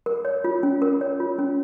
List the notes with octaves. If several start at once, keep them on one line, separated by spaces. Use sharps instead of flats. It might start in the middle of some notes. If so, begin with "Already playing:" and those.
A#4
C#5
F4
C#4
A#4
C#5
F4
C#4